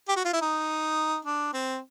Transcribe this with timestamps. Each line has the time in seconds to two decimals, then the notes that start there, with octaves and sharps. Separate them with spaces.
0.08 G4
0.16 F#4
0.25 F4
0.33 E4
0.42 D#4
1.25 D4
1.53 C4